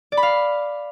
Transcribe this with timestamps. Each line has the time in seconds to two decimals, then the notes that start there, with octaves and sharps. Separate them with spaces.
0.12 D5
0.17 B5
0.23 F5